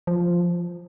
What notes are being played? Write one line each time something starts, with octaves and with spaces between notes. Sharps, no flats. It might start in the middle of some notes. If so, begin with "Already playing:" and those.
F3